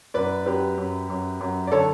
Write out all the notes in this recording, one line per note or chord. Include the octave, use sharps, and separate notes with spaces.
F#2 B4 D5
F#2 G4 B4
F#2
F#2
F#2
D5
D3 A4 C#5